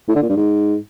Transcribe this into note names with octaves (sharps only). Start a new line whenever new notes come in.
A2
D3
A#2
G2
G#2